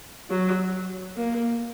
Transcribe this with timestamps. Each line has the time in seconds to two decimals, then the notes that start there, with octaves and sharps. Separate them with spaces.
0.30 F#3
1.16 A#3